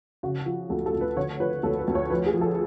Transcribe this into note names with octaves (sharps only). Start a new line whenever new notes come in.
C#3 F#4
F3
D2 A4
A4
D2
B4
D3 C#5
F3 B4
D2 A4
B4
D2
C#5
F2 B4
G#4
F3
A4